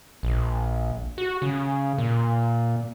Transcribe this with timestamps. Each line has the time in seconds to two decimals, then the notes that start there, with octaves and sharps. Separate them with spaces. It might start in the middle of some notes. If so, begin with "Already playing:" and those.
0.23 A#1
1.18 F#4
1.42 C#3
1.98 A#2